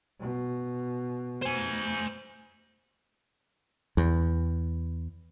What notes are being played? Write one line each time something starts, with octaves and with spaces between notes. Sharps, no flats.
B2
C5 G#5
E2